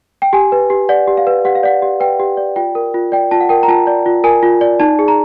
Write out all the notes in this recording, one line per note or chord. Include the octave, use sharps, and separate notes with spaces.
G5
G4 G#5
B4
G4
D5 F#5
G4
F5
B4
G4 F#5
F5
D5 F#5
G4
B4 G5
G4
D5
F4 G5
A#4
F4
D5 G5
F4 A5
F#5
A#4 G5
A#5
F4 A5
D5
F4
A#4 G#5
F4
D5
D#4 A5
G#4
A#5